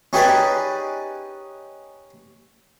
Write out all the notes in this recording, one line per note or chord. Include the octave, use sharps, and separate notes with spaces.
C#4 D#4 G4 G#4 B4 D5